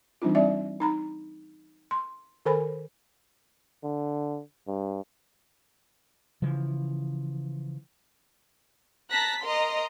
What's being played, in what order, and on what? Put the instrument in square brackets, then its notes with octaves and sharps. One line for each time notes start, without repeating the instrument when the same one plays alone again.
[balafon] E3 G3 C4 D4 D#4 F4
G3 C4 D5 E5
D#4 A#5 B5
C6
D#3 A4 A#4 C5 G#5 B5
[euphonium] D3
G2
[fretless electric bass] C#3 E3 F3
[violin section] A5 A#5 F#6 A#6 B6
A#4 D#5 A#5 C6